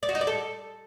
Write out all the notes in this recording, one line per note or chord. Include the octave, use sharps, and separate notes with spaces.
D5
F#4
D#4
D5
A4